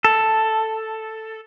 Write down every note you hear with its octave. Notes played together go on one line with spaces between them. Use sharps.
A4